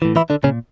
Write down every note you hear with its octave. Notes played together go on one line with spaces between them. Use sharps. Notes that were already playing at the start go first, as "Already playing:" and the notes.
A2 E3
E3 E4
D3 D4
A#2 C#3 C#4